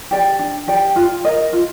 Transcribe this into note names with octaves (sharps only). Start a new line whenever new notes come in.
G4 D5 G5
D4
G4 D5 G5
F4
A#4 D#5
F4